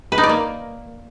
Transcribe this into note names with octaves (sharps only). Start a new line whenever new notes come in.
B4
D#4
D5
A#3